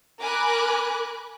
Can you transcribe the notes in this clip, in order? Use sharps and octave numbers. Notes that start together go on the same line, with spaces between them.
A#4 G#5 B5 D6 F#6